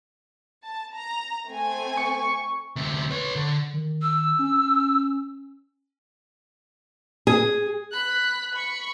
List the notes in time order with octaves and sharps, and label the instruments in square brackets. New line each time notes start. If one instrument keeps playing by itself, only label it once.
[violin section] A5
A#5
A3 C4 G#5
[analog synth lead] C#6
[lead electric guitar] D2 C3
B4 C#5
D3
[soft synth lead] D#3
[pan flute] E6
[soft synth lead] C#4
[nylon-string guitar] G#4
[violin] B5 F#6
B5 C#6